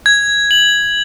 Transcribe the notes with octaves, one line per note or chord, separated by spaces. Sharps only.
G#6
F#7